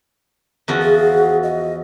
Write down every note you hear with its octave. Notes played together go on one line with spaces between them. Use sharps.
E2 F3 F#4
G#4
D#5